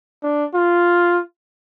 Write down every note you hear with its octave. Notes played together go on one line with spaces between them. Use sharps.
D4
F4